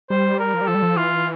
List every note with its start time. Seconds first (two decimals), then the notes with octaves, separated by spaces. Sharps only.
0.10 G3 C5
0.39 A#4
0.54 F3
0.61 G3
0.67 F3 A4
0.75 G3
0.82 F3
0.96 E3 F4